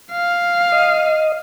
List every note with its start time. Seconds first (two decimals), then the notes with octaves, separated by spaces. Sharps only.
0.12 F5
0.72 D#5